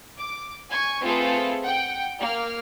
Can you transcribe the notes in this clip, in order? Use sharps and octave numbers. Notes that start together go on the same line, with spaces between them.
D6
G#5 C#6 G#6
A3 C4 F4 G#4 A4 B4
F#5 G5
A#3 F6